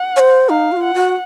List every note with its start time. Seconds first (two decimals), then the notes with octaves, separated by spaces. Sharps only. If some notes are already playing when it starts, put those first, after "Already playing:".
Already playing: F#5
0.16 C#5
0.20 C5
0.49 D#4 F5
0.72 F#4
0.77 F4
0.83 F#5
0.94 F#4